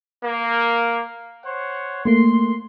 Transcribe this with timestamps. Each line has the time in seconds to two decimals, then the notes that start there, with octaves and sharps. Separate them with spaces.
0.24 A#3
1.45 C5 C#5 F#5
2.05 A3 A#3 C6